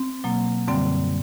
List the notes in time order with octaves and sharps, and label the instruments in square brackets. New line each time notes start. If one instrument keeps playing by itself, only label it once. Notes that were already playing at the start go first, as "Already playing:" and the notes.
Already playing: [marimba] C4
B2 F#3 A#3
F#2 D3 G3 C4